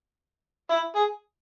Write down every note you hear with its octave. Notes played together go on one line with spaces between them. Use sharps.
E4
G#4